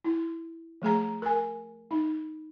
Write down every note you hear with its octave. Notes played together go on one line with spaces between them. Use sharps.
E4
F3 A3 G#4 A#5
A#4 G#5
D#4